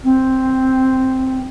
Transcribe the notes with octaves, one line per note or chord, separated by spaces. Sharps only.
C4